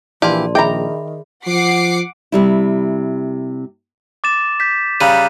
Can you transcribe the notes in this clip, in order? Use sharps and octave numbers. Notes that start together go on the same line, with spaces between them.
A#1 E3 G4 D5 F5 A5 C6
D#3 G#4 E5 G5 A#5 B5
F3 F#5 D6 C7
C3 G3 E4
D6 A6 E7
G6 B6
C#3 G3 A#5 F#6 D#7